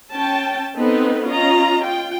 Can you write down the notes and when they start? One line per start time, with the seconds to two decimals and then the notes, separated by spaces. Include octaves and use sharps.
0.14 C#4 G5 A5
0.76 B3 C4 D#4 A4 B4
1.25 C#4 F4 D#5 A#5
1.83 F4 G5